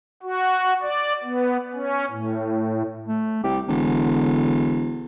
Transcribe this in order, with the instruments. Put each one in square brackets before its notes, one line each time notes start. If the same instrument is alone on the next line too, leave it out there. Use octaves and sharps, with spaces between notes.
[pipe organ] F#4
D5
B3
C#4
A2
[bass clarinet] A3
[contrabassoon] C2 [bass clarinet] G4
[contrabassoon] E1 [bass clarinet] D3